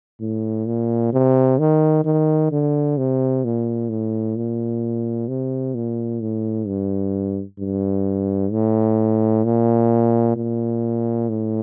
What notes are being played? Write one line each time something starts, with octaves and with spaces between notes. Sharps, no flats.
A2
A#2
C3
D#3
D#3
D3
C3
A#2
A2
A#2
C3
A#2
A2
G2
G2
A2
A#2
A#2
A2